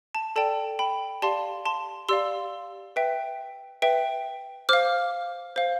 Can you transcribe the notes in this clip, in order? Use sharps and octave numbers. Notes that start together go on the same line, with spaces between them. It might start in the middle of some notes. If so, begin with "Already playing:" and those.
A5
A4 D5 G5 A5
G5 B5
G4 D5 F5 A5 C6
A5 C6
G4 D5 F5 C6 E6
B4 E5 G5
B4 E5 G5
C5 F5 D6 F6
C5 F5